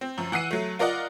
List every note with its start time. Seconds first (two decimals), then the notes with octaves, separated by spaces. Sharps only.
0.01 C4
0.18 F#2 F3
0.32 E3 F#5 E6 C7 D#7
0.51 F#3 A3
0.79 F4 A#4 D5 D#5 F#5